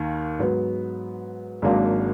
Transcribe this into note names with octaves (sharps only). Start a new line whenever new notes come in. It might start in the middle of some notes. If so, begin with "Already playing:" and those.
Already playing: D#2 D#3 A#3
G#2 F#3 B3
G#1 G#2 F#3 A#3 D4